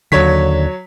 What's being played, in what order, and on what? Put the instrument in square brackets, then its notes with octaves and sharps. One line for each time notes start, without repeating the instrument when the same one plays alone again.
[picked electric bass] D#2 D3 [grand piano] F#3 C#5 B6